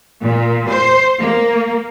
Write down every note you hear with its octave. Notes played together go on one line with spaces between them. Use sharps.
A#2
C5
A#3